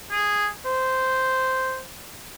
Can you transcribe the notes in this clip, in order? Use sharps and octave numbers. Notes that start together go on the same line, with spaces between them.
G#4
C5